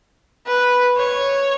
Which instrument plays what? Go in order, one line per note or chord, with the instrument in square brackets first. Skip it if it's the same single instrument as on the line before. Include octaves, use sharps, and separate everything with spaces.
[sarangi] B4
C#5